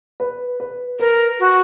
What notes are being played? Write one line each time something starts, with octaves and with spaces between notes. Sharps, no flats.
B4
B4
A#4 B4
F#4